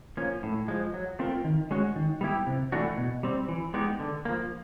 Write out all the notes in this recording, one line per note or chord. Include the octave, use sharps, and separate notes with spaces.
F3 A#3 C#4
A2
F3 G#3
F#3
A3 C4 F4 A#4
D#3
G#3 C#4 F#4
D#3
G3 B3 E4 G4
C3
E3 A3 D4 F#4
B2
G3 C4
E3
G#3 B3 D#4 G4
D3
F3 A#3